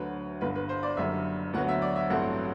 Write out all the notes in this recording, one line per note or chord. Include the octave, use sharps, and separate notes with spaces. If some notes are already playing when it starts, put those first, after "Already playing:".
Already playing: D2 D3 F#3 B4
G1 G2 D3 B4
B4
C5
D5
F#1 F#2 D3 G3 E5
D2 D3 F#3 B3 F#5
E5
D5
E5
A1 G2 F#3 A3 C4 F#5